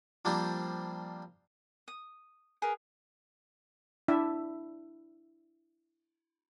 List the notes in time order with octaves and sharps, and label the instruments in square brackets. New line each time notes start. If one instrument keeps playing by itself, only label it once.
[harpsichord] F3 G3 A#3 C4 D4
[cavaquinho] D#6
G#4 A#4 B4 D#5
[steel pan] D4 E4 E5